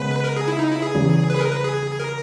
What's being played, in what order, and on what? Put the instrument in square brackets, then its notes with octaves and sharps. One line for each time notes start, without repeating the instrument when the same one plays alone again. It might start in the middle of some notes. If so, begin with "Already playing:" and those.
Already playing: [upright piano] C#3 G#3 B3 [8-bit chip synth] B4
[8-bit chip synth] A#4
G#4
E4
D#4
E4
G#4
[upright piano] E2 C#3 G3
[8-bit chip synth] B4
G#4
A#4
B4
G#4
A#4